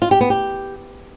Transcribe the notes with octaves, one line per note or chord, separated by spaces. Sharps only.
F4
G4
B3
G4